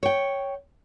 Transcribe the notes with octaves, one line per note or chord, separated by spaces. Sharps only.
C#5 G5